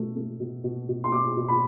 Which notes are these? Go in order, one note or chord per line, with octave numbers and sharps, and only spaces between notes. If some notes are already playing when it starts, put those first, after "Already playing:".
Already playing: B2 A3
A3
B2
B2
B2
C6
B2 D6
B2
B5